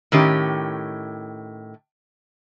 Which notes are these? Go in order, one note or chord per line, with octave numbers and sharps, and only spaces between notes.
A2 D#3 C#4 G4